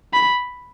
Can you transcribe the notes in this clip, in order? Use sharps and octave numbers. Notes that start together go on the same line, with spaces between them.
B5